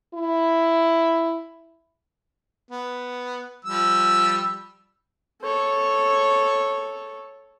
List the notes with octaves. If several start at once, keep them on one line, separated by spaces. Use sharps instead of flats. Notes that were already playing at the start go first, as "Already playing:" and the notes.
E4
B3
F3 G3 E6
A4 C#5